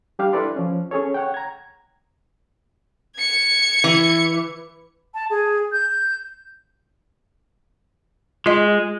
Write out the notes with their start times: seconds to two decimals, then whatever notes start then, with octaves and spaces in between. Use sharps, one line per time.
0.19 G3 D4 G4 F5
0.33 D4 E4 A4 B4 D5 C6
0.56 F3 C#4
0.91 C#4 G#4 A4 C#5
1.14 C#5 F#5 G5
1.34 A#5 G#6
3.18 G#6 C#7
3.84 E3
5.14 A5
5.30 G#4
5.72 G6
8.46 G#3 F4 D#5